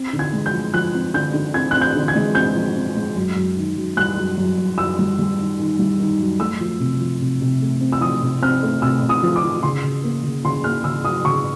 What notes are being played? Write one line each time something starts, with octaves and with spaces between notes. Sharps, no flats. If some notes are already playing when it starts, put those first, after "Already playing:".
Already playing: C4
D3
G#6
G#3
G6
F3
F3 F#6
C4
D3 G6
D3
C4 G#6
C4 F#6
G6
D3
G#6
G#3
C4 G6
F3
C4
G#3
F#2
F#2
D#3
F#2
G3 F#6
F#2
F#2
F#2
F#2 E6
G3
G3
D#3
D#3
G3
D#3
F#2
A3 E6
F3
C3
F3
C3
C3
A3
C4
E6
F3 D#6
C3
C4 F6
A3
C3 E6
C3
D#6
F3
D6
F3
C#3 C6
C#3
A#3
C#3
C#3 C6
A#3 F6
C#3 E6
F#3 D#6
C#3 C#6